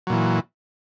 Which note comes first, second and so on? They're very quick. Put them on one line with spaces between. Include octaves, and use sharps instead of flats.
F#3 A#2 E3